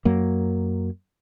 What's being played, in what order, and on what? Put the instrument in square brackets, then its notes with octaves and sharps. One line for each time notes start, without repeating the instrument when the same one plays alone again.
[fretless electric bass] F#2 F#3 A#3